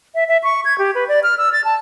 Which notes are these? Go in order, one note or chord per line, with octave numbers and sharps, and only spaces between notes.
E5
E5
C#6
G#6
G4
B4
D5
F6
E6
A6
A5